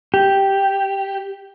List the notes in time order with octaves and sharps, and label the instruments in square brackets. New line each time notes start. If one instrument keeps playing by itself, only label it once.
[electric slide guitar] G4